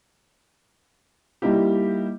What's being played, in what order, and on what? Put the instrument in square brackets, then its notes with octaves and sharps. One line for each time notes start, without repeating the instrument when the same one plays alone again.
[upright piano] G3 A#3 D#4 E4 G4